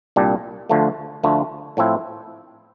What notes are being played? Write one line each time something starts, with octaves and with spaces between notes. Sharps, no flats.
C2 A#2 G3 D4
D2 D3 F3 A3
D2 D3 F3 A3
A2 F3 C4 E4